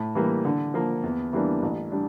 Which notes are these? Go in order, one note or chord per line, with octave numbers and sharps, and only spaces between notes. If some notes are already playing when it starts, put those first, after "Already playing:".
Already playing: A2
E3 G3 A#3
D3
F3 A#3
E2
E3 G3 A#3 D4
A1
G3 D4